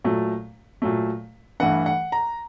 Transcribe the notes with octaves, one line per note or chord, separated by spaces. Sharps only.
A#2 F#3 A3
A#2 F#3 A3
G2 E3 A3 F#5
F#5
A#5